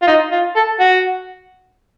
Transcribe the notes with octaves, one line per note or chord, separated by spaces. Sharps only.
F4
D#4
F4
A4
F#4